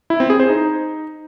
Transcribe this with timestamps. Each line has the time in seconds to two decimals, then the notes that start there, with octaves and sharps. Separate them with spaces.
0.10 E4
0.20 C4
0.30 G#4
0.40 C5
0.49 D#4